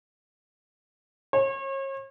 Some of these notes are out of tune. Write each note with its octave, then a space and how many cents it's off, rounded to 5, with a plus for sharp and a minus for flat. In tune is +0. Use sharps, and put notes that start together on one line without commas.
C#5 -35